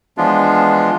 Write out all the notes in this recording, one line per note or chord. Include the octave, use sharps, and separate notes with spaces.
E3 F3 G#3 B3 D4 F4